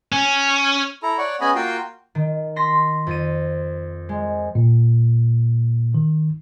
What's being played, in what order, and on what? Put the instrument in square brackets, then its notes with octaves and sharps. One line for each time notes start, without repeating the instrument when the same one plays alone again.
[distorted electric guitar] C#4
[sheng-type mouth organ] E4 A4 A#5
C#5 D5 F#5 C#6
B3 C#4 G#4 D#5 G#5 B5
A#3 F4 F#4 G5 C6
[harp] D#3
C6 A#6 B6
F2 D#7
G#3
[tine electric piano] A#2
D#3